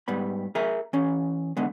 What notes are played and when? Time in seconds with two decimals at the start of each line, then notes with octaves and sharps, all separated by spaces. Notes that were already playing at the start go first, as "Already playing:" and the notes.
0.08 G#2 G3 B3 B5
0.55 G#4 A#4 E5 G#5 A#5
0.93 E3 C#4
1.57 D3 G#3 B3